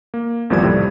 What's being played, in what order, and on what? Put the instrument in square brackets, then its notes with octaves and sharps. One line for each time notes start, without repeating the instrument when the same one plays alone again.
[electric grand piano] A#3
G#1 E2 F3 G3 A#3 G#6
F2 A2 C3 G3